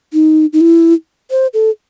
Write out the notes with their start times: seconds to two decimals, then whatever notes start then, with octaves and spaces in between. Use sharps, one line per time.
0.13 D#4
0.53 D#4
0.61 E4
1.31 C5
1.54 A4